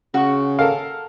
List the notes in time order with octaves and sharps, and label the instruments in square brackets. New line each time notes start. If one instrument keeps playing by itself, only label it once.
[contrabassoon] C#3 [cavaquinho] F#4 C#6
[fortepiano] A4 A#4 F5